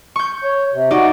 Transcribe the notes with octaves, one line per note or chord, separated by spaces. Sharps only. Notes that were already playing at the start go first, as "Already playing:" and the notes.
C#6 G6
C#5
C3
D#4 F#4 D5